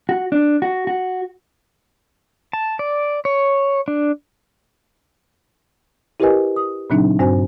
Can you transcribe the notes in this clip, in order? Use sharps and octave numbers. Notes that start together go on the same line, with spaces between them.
F#4
D4
F#4
F#4
A5
D5
C#5
D4
E4 G4 A#4 B4 D#5 G#5
D#6
A#2 C#3 F#3 C4 D4 D#4
G2 C4 F#4 C5 G#5